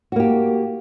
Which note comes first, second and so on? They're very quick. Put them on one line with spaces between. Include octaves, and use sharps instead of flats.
F#4 A#3 G4